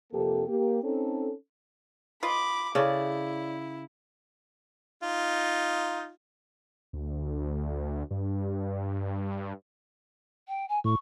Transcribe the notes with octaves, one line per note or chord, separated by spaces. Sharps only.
F2 C3 A#3 G4 A4
A#3 G4
C4 C#4 D#4 A4
F4 B4 D#5 B5 D6
C#3 E4 A4 C#5 D5
D#4 F4
D2
G2
G5
G#5
A2 C#6